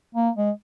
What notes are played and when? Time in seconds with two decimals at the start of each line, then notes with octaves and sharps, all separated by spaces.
0.15 A#3
0.36 G#3